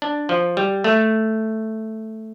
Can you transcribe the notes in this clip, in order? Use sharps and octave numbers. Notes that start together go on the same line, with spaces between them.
D4
F3
G3
A3